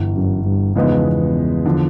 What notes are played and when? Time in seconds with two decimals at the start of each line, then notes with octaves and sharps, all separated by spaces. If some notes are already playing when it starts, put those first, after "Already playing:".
Already playing: G1 G2 E3
0.16 F#2
0.45 G2
0.76 E2 C#3 F3 G#3 B3 D#4
1.66 D3 F3